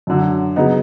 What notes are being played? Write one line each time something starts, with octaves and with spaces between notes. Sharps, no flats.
F#2 D3 F#3
C#3 F#3 B3 D#4